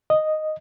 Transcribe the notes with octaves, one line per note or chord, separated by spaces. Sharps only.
D#5